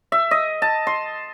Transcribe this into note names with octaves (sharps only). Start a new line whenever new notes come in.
E5
D#5
A5
C6